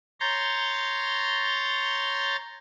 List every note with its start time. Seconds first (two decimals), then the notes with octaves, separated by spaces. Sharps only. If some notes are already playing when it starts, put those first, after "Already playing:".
0.20 C#5 A#5 C6 G6 A6